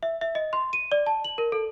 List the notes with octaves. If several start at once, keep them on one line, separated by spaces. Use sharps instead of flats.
E5
E5
D#5
C6
D#7
D5
A5
F#7
A#4
A4